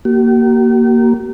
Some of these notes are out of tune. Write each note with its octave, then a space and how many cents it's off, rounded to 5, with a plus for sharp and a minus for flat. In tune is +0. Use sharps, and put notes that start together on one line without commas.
A#3 +0 G4 -45